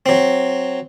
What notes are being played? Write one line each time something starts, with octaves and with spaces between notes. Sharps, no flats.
F#3 C4